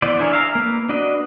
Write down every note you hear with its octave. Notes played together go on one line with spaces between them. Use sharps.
E3 B3 C5 D5
D4 E4 G#4 A#4 C#5
E5 F5 A#5
A#3 B4
D4 F#4 B4 D#5